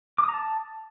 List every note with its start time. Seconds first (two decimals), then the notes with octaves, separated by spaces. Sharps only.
0.18 D6
0.23 D#6
0.29 A#5
0.34 A5